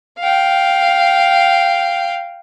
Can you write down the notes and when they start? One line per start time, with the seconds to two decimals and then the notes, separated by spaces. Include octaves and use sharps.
0.19 F5 G5